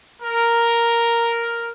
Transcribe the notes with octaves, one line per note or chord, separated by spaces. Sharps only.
A#4